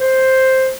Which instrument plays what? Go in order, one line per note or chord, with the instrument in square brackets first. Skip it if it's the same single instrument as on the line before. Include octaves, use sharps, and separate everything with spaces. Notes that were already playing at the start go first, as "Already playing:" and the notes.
[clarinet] C5